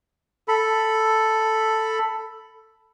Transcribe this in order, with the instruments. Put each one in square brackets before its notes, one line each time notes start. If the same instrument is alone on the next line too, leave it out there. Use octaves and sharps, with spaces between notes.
[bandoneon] A4 B5